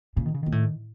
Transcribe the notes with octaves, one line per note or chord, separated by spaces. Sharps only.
A#2 C#3
D#3
C#3
A#2 D#3
A2